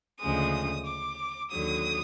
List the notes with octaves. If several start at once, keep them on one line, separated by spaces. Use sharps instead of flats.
D2 C#3 F3 G#3 D#6
D6
D#2 D3 F#3 D#6